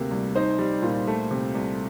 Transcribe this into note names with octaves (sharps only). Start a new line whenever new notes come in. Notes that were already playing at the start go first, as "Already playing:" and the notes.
Already playing: D2 C3 A#3
C2
D#4 C5
G3
A#2
A3
C3
C2